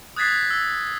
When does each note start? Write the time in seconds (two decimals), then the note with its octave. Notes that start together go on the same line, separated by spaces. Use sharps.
0.16 D#6 F#6 G#6 A6 B6 C7
0.50 E6